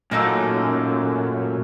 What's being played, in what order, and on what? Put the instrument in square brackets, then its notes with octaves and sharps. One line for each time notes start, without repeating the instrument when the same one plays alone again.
[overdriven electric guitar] F#2 [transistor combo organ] A#2 A3 C#4 [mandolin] A#3 D#4 A4